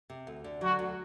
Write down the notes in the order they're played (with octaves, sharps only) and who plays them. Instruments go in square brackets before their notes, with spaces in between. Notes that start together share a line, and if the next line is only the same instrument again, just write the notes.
[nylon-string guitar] C3
D2
D3
[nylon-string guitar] F#3 [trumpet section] F#4
[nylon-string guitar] D2